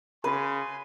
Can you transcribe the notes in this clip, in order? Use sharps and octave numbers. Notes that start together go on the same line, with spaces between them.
C#3 B4 G#5 C6